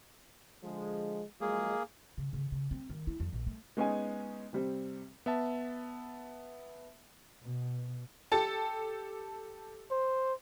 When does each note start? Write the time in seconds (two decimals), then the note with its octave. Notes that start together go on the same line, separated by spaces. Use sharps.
0.64 D3 F3 G#3
1.41 F3 F#3 G#3 A#3 G#4
2.18 C#3
2.33 C#3
2.52 C#3
2.71 C4
2.90 D#3
3.07 E4
3.20 F2
3.33 A#1
3.47 A3
3.77 G#3 B3 C#4 D#4 G#4 G#5
4.53 C3 G3 C4
5.26 B3 E5 A5
7.41 B2
8.32 G4 A4 A5
9.91 C5